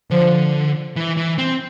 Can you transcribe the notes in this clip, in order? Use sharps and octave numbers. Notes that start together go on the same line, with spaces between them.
D3 F3
E3
E3
C4